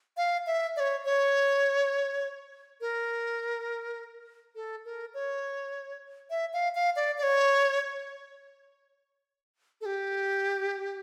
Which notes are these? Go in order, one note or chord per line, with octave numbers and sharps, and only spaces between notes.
F5
E5
D5
C#5
C#5
A#4
A4
A#4
C#5
E5
F5
F5
D5
D5
C#5
A4
G4